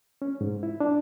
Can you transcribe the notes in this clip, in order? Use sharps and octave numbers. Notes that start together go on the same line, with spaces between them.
C#4
G#2
E4
D4